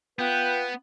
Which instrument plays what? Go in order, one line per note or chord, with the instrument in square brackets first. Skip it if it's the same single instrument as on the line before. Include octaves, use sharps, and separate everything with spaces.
[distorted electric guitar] B3 [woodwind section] F4 B4 G5